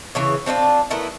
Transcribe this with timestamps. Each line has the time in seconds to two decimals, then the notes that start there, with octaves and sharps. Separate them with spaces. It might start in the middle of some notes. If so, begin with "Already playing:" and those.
0.15 C#3 E3 C#5
0.46 C4 D4 E4 F4
0.90 A3 B3 E4 A#4